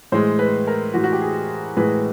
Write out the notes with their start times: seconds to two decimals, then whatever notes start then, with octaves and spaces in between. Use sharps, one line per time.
0.12 A2 E3 G#3 C5
0.39 B4
0.67 A#4
0.94 A2 E3 G#3 F#4
1.04 F#4
1.13 G4
1.22 G#4
1.77 A2 E3 G#3 B4